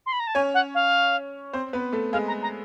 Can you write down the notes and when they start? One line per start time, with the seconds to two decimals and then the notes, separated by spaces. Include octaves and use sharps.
0.06 C6
0.12 B5
0.20 A#5
0.27 A5
0.35 C#4 C#5 G#5
0.54 F#5
0.74 F5
1.53 C4 C5
1.73 B3 B4
1.93 A3 A4
2.13 G#3 G#4 F5
2.27 A#5
2.42 A#5